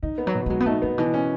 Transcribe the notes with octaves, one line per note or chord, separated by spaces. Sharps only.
D#3 D#4
B3
F#3
B2
A3
F#3 G#3
B3
A3 D#4
A3 B3
A2
B2 E3
C#4